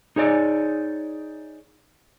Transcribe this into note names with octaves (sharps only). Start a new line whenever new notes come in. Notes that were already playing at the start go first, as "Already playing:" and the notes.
D#4 G#4 C#5 D5